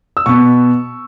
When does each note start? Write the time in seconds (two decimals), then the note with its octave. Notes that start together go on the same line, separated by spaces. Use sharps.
0.17 E6
0.26 B2 B3 C#6